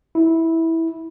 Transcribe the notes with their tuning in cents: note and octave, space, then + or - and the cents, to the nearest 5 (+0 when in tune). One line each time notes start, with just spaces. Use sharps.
E4 -15